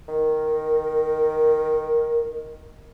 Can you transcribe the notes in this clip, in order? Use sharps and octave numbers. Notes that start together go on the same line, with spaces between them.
D#3 A#4